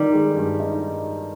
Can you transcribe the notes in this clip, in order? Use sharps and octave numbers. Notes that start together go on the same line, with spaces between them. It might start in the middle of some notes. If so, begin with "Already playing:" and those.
Already playing: D#3 G3 D#4
G#3
G2
D#4